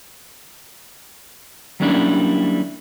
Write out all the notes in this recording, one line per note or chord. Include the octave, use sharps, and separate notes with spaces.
F#3 G3 A#3 C#4 D4 E4